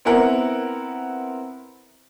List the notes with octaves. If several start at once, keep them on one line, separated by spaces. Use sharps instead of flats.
B3 C4 E4 A#4 F#5